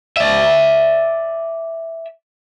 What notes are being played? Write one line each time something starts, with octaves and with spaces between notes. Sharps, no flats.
D5 E5